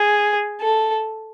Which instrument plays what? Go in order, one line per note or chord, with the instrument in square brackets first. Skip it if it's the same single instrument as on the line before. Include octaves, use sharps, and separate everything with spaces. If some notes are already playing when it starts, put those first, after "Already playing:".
Already playing: [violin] G#4
A4